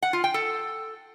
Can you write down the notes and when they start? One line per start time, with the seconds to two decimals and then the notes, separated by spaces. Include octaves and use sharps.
0.02 F#5
0.13 F4
0.24 G5
0.34 A4